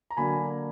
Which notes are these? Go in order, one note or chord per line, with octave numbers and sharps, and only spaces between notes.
A#5
D3 F#3 A#3 G#5 B5